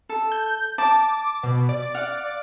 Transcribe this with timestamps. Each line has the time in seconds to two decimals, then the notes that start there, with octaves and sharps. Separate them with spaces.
0.09 A4
0.32 G6
0.78 A5 D6
1.43 B2
1.69 D5
1.94 F5 F#5